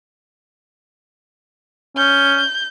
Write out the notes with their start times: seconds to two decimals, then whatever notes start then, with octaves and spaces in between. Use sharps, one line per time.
1.97 C#4 G6